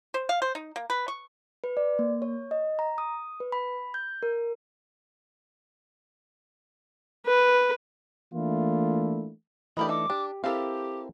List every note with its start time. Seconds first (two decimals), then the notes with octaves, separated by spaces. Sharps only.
0.14 C5
0.29 F5
0.42 C5
0.55 D#4
0.76 A#3
0.90 B4
1.08 C#6
1.64 B4
1.77 D5
1.99 A#3
2.22 C#5
2.51 D#5
2.79 A#5
2.98 D#6
3.40 B4
3.52 B5
3.94 G6
4.23 A#4
7.26 B4
8.34 E3 A3 A#3 D4 E4 F4
9.77 E3 A3 D4 G4 A#4 D#5 B5
9.89 D#4 A4 D6
10.10 D4 G4
10.44 C4 E4 G4 A4 A#4 F5